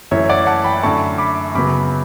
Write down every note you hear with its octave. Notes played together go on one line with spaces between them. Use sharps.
F#2 E3 A3 C#5 E5
D5 F#5
F#5 A5
G5 B5
F#2 D3 A3 A5 C#6
B5 D6
F#2 C#3 F#3 B3 B5 D6